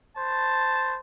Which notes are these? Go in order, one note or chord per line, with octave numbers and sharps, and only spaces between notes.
C5 A5